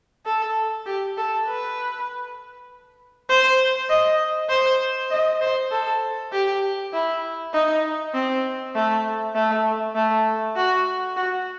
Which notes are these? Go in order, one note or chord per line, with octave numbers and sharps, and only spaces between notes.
A4
G4
A4
B4
C5
D#5
C5
D#5
C5
A4
G4
E4
D#4
C4
A3
A3
A3
F#4
F#4